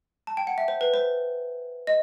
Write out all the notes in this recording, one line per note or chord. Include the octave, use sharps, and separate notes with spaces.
A5
G5
F#5
E5
C5
B4
C5
D#5